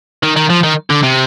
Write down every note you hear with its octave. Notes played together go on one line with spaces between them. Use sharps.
D#3
D#3
F3
D#3
D3
C3